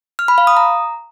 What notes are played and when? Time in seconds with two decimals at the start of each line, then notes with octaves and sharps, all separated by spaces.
0.19 F6
0.28 B5
0.38 F5
0.47 D#6
0.57 A#5